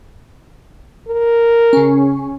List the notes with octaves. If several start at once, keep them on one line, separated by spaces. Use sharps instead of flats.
A#4
C#3 C#4